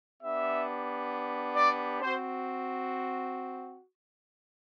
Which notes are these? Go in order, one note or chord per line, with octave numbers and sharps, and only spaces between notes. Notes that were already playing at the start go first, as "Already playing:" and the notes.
B3 D4 G4 E5
D5
C4 F#4 C5